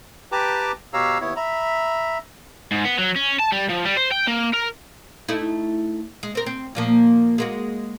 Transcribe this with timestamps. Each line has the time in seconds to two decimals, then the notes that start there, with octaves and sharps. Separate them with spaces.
0.32 G4 B4 G5 A5 A#5 D6
0.93 B2 G4 C#5 F5 A#5 E6
1.21 D#2 B3 E4 C#5
1.36 E5 A#5 B5
2.71 G#2
2.85 B3
2.99 F#3
3.16 C#4
3.40 A5
3.53 G3
3.70 F3
3.86 G3
3.97 C5
4.12 G5
4.28 A#3
4.54 A#4
5.28 A3 D#4 E4
6.23 G#3
6.35 C4 A#4
6.46 C4
6.75 A#2 F3 A#3
7.38 G#3 A#3 F#4